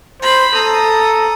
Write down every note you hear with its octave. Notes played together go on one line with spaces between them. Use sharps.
C5 B5
A4 A#5 D#6